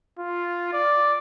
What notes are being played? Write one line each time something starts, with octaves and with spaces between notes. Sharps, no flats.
F4
D5